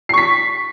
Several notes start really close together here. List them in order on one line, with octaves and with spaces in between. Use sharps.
C7 C#6 B6